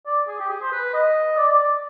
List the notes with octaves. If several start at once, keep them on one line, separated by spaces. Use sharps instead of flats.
D5
G#4
G4
G#4
C5
B4
D#5
D5
D5
D5